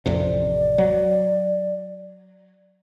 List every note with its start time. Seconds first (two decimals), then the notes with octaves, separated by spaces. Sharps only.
0.06 A1 F2 C3 D5
0.78 F#3